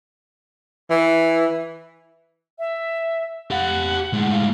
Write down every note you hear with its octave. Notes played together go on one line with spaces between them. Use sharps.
E3
E5
G4 F5 F#5
A2 G#3
F5